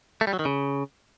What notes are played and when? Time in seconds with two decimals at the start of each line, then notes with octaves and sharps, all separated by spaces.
0.21 A3
0.27 G3
0.33 F#3
0.39 D#3
0.45 C#3